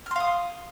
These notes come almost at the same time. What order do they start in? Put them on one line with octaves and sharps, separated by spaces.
F6 C6 F5 D#6